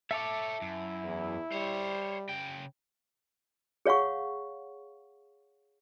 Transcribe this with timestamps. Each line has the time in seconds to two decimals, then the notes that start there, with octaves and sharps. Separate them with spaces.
0.11 A4 C#5 E5 A5 D6
0.62 F#2 E4
1.03 E2
1.52 G3 C5 C#5
2.29 C#3 G5
3.86 G#4 C#5 F5 F#5 C#6